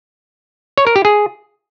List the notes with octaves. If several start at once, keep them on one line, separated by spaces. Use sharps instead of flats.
C#5
A#4
G4
G#4